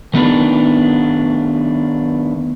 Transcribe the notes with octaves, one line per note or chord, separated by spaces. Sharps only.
D#3 A3 B3 D4 D#4